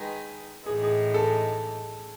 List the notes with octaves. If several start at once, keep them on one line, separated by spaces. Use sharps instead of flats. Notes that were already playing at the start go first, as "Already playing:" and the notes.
Already playing: D#3 G#3 D#4 G#4 B4
A2 E3 G#3 D#4 G#4
G#4
A4